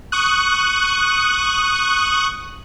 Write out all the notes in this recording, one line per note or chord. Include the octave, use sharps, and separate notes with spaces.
C#6 D#6 F#6